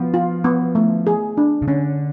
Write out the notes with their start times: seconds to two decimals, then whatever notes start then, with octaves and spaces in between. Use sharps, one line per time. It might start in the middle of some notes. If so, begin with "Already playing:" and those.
Already playing: F3 B3
0.14 F4
0.44 B3
0.75 A3
1.07 G#4
1.37 D4
1.62 C#3
1.68 D3 C#4